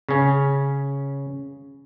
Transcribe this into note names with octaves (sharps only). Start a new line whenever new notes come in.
C#3 C#4